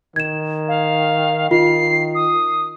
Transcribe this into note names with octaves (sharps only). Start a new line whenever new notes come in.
D#3 G#6 E7
F5
D#3 F4 C7
D#6